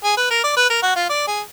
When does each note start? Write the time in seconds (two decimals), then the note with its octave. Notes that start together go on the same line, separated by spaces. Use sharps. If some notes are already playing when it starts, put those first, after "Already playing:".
0.04 G#4
0.17 B4
0.30 A#4
0.43 D5
0.56 B4
0.70 A#4
0.82 F#4
0.95 F4
1.09 D5
1.27 G#4